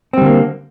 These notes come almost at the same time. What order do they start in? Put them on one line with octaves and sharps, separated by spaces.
C4 G3 D3 A#3